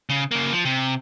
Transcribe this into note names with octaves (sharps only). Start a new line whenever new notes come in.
C#3
C#3 A#3
F3
C3